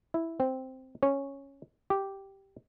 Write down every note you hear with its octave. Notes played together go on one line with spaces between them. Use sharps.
E4
C4
C#4
G4